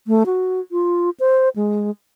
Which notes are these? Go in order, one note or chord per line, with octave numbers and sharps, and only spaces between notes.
A3
F#4
F4
C5
G#3